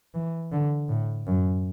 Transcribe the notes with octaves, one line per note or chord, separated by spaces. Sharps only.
E3
D3
A2
F#2